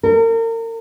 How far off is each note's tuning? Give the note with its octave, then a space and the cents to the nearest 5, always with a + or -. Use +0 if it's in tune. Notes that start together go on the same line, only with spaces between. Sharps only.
A#4 -35